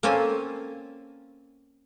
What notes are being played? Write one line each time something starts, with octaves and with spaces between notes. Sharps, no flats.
A#3 C4 C#4 A4 G#5